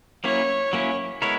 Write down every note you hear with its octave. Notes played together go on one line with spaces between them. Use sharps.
F#3 A#3 C#4 E4 C#5
F#3 A#3 C#4 E4
G#3 B3 E4 A#4 C#5